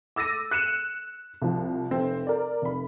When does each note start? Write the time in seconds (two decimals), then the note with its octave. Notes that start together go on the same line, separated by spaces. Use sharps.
0.16 D6 E6 A6 A#6 D#7
0.51 F#6 C#7 D#7 E7
1.42 C2 F3
1.91 F1 C4
2.27 A#4 D5
2.62 F1 B5